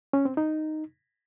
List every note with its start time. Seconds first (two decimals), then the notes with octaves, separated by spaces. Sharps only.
0.13 C#4
0.25 C4
0.37 D#4